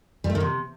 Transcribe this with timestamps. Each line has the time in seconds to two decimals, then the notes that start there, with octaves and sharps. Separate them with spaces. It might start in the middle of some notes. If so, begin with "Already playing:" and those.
0.24 G3
0.30 A3
0.35 D#3
0.40 C3